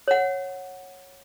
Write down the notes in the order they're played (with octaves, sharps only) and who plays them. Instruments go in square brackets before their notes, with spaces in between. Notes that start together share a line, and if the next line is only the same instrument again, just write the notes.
[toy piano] C#5 F#5